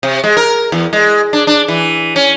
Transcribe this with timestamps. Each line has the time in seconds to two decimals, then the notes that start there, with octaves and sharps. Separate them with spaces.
0.03 C3
0.24 G#3
0.37 A#4
0.72 E2
0.93 G#3
1.33 D4
1.47 D4
1.68 E3
2.16 C#4